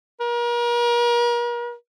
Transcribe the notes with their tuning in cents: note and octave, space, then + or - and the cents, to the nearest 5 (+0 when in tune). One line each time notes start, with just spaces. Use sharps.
A#4 +40